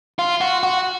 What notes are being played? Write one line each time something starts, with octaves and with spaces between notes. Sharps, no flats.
F4
F#4
F#4